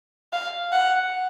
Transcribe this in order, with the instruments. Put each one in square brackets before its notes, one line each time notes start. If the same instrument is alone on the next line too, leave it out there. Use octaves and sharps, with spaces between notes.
[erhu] F5
F#5